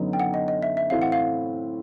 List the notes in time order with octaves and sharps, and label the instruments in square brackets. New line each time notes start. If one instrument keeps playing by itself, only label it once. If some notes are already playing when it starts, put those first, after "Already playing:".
Already playing: [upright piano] F#2 D3 F#3 B3 D#4
[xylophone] G5
F#5
D#5
D#5
E5
E5
[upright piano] A2 E3 A3 C4 [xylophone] F5
[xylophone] F#5
F5